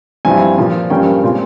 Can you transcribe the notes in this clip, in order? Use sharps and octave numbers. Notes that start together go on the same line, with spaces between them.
G2 F3 C4 E4 G#5
A#2 F3 A#3
G2 F3 A#3 C#4 G5
A#2 G#3 C4 F4